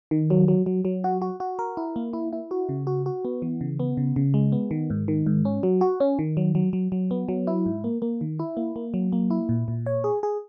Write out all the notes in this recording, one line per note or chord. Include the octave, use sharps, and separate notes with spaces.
D#3
F#3
F#3
F#3
F#3
F#4
F#4
F#4
A#4
E4
A#3
E4
E4
F#4
C#3
F#4
F#4
B3
E3
C#3
B3
C#3
C#3
G#3
B3
D#3
G#2
D#3
G#2
C#4
F#3
F#4
C#4
D#3
F#3
F#3
F#3
F#3
B3
F#3
E4
G#2
A#3
A#3
D#3
E4
A#3
A#3
F#3
A#3
E4
A#2
A#2
C#5
G#4
G#4